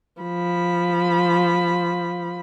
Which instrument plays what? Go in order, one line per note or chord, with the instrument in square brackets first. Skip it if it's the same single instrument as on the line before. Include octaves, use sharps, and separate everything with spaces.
[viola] F3 B5